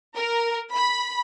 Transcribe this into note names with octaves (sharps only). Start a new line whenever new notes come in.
A#4
B5